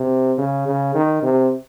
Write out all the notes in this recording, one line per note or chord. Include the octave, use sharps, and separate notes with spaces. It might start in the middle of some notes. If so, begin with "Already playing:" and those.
Already playing: C3
C#3
C#3
D#3
C3